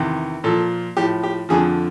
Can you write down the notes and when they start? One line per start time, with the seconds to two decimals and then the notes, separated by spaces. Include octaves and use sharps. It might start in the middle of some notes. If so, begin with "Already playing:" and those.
Already playing: E2 C3 D#3
0.44 A#2 F3 A4
0.97 A2 F3 G4
1.23 G4
1.49 F2 D3 F3 G#4